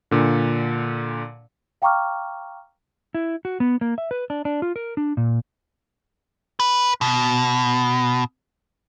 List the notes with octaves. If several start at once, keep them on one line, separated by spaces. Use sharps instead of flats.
A#2 D3
F5 G5 A#5 C#6 D6 F6
E4
F#4
B3
A#3
E5
B4
D4
D4
F4
A#4
D4
A#2
B4
B2